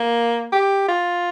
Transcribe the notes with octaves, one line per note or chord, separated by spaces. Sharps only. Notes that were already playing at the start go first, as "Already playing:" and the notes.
Already playing: A#3
G4
F4